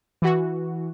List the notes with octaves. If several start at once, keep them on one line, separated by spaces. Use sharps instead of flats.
E3 F#4